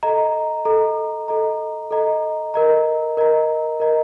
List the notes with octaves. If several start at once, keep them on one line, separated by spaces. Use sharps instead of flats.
A4 D#5 A#5
A4 D#5 A#5
A4 D#5 A#5
A4 D#5 A#5
A#4 D#5 A#5
A#4 D#5 A#5
A#4 D#5 A#5